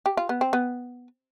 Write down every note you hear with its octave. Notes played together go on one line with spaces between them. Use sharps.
G4
F4
B3
C4
B3